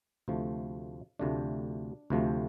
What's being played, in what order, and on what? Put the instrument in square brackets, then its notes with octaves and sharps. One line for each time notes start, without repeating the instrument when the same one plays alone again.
[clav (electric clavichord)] D2 C3 F3 A3
D2 C3 F3 A3 D4
D2 C3 F3 A3